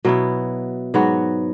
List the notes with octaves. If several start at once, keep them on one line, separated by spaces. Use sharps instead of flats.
B2 F#3 B3 E4
G#2 F#3 B3 F#4